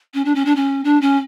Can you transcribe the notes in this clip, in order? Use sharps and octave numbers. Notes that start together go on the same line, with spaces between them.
C#4
D4
C#4
D4
C#4
D4
C#4